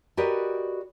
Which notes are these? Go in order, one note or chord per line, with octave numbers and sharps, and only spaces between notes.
F#4 G4 A#4 B4 D5 D#5